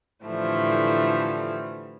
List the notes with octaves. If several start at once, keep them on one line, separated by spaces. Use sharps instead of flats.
A2 D3 E3 F3 G3 A3